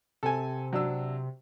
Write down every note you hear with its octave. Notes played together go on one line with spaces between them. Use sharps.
C3 A4 G#5
F#3 D4 E6